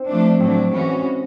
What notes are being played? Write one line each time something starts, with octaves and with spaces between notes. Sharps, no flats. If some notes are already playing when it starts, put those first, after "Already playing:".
Already playing: C4 D#4
F3 A3 D4
A2 F#3 A3 C4 D4
E3 G#3 C#4 F#4